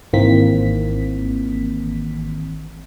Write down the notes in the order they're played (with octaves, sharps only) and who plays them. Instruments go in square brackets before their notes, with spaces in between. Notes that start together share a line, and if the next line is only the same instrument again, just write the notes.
[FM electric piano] G#1 D#3 E3 A#3 C4 B6